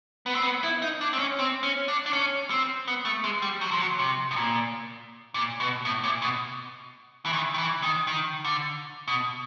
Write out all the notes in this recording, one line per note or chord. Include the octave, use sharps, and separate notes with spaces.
B3
C4
B3
E4
D#4
D4
C4
C#4
C4
C#4
D4
D4
C#4
C4
B3
A3
G#3
G3
F#3
F3
F#3
C3
A2
A#2
A#2
B2
A2
A#2
B2
E3
D#3
D#3
E3
D#3
D#3
D3
B2